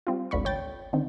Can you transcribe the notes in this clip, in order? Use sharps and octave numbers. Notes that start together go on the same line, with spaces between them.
G3 C4 F4
G#1 D2 D3 B5 C#6
A1 C#5 G5 A6
D3 D#3 C4